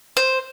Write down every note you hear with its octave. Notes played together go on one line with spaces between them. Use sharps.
C5